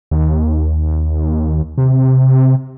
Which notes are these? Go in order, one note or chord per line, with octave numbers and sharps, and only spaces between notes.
D#2
C3